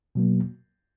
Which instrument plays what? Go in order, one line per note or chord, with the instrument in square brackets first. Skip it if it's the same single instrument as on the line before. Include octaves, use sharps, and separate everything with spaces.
[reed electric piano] B2 F#3 A#3